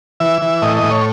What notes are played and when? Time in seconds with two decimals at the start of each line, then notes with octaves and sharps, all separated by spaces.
0.20 E3 E5
0.42 E3
0.62 A2 D#5
0.77 D#5
0.83 A2
0.91 C#5